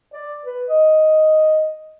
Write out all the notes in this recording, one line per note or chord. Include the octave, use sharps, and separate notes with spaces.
D5
B4
D#5